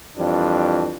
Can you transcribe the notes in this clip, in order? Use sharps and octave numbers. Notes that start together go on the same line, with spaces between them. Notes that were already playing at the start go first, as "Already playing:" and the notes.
F2 E3 F3 G3 D4